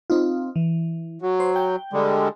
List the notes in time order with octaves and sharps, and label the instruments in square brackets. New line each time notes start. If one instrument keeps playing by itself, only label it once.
[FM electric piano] C4 D#4 F4
E3
[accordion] F#3
[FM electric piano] C5
G5
[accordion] D3 G3 G#3